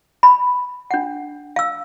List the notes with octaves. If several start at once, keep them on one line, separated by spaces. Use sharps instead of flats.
B5
D4 F#5
F5 E6